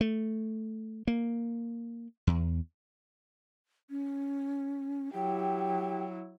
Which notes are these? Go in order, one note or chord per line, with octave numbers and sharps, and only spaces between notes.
A3
A#3
E2
C#4
F#3 E4 G4 G5